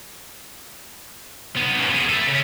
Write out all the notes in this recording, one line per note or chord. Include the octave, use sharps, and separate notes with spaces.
B3 D#4
C#3 A#3
B3 G#4
A3 A4
C#3